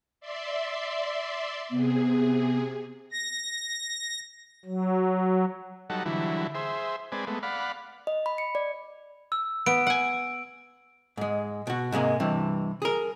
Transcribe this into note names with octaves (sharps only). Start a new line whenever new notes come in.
D5 E5 C6
C3 B3 G#4
A#6
F#3
F#3 G3 D#4 A4 F#5
D3 E3 F#3 G3 E4
G#4 C5 E5
G#3 C4 B4 D5 G#5
G#3 A3 B3
D5 F5 F#5 B5
D#5
B5
C#7
D5
E6
B3 D7
F#5 G#5
G#2 G#3
B2 F#4
G#2 C3 G#3 A#3
G2 C3 E3
G#4 A#4